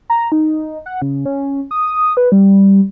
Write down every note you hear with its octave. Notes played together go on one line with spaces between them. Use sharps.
A#5
D#4
F#5
C#3
C#4
D#6
B4
G3